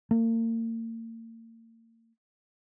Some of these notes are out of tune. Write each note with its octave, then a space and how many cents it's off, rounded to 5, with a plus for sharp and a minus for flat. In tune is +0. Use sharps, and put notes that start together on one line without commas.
A#3 -40